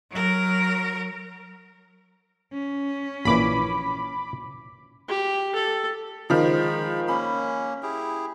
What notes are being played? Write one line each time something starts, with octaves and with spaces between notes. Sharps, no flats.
F#3 A#4
C#4
A#1 A#2 E3 B5 D6
G4
A4
D#3 F3 G#3 B5
A#3 C#4 B5
E4 G4 G#4